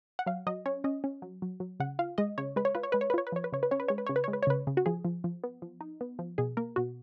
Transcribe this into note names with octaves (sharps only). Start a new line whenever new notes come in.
F#5
F#3 F5
F#3 D#5
C#4 C#5
C#4 D#5
C#4
F#3
F#3
F#3
C#3 F#5
F4 F5
G#3 D#5
C#3 C#5
G#3 B4
C#5
F4 B4
C#5
G#3 B4
C#5
B4
F4 C#5
B4
F3 C#5
B4
C#3 C#5
B4
C#4 C#5
B4
G#3 C#5
B4
C#3 C#5
B4
C#5
G#3
B4
C#5
C#3 B4
C#3
F#4
F3 G#4
F3
F3
B3
F3
D#4
B3
F3
B2 G#4
A#3 A#4
B2 F#4